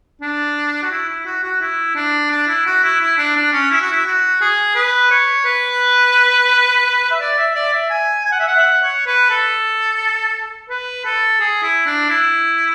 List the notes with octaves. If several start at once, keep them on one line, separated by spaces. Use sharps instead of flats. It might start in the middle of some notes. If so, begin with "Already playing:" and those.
D4
F#4
E4
E4
F#4
F#4
E4
D4
D4
E4
F#4
E4
E4
D4
D4
C#4
E4
F#4
E4
F#4
G#4
B4
C#5
B4
E5
D5
E5
D5
E5
G#5
G#5
F#5
E5
F#5
E5
F#5
C#5
B4
A4
B4
A4
G#4
E4
D4
E4